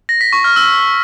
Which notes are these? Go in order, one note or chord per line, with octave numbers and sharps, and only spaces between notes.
A#6
B6
C#6
F6
E6